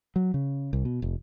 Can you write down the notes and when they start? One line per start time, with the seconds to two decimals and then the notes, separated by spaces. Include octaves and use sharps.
0.16 F#3
0.34 C#3
0.73 C2
0.85 B2
1.02 F1